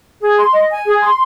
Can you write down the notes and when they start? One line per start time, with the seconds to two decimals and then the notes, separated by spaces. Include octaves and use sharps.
0.22 G#4
0.39 C6
0.54 D#5
0.70 G#5
0.86 G#4
1.02 C6